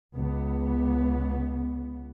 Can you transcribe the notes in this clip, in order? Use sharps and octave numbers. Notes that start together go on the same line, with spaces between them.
C#2 B3